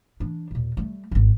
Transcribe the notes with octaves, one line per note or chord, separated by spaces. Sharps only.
E3 D4
D#2 A#2
G3 A3
D#1 G#1